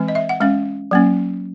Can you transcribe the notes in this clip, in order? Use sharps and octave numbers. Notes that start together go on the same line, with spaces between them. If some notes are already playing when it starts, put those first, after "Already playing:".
Already playing: E3 G#3 C4
D#5
E5
F#5
G#3 C#4 F5
F#3 A#3 C#4